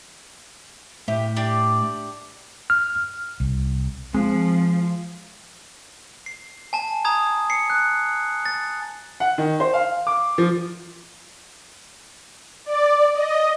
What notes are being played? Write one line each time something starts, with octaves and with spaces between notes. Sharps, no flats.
A2 G4 E5
D4 G4 D5
F6
C2
F3 G#3 C4
C7
G#5 A5
A#5 D#6 G#6
C7 C#7
F#6
A6
F#5
D#3
C5
F5
D6
F3
D5
D#5